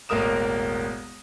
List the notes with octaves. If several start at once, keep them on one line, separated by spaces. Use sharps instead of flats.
E1 A1 A#3 A#4 D#6 E7